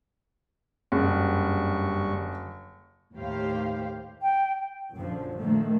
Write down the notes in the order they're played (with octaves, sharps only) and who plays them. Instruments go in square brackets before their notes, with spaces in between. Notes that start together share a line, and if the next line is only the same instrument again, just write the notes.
[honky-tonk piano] F#1 [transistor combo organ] G2 D3 C#6
[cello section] D#2 A2 G4 C5 F5
[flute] G5
[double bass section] A#1 F#2 A#2 D3 F3
A#2 D3 D#3 F3 A3 A#3